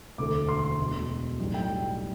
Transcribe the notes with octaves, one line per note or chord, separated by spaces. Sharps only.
E1 D2 D3 A3 D6
C6
C6
E1 E2 B2
B1 A2 G3
G5